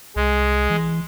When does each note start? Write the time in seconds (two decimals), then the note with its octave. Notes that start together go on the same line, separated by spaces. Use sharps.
0.16 C2 G#3
0.70 E3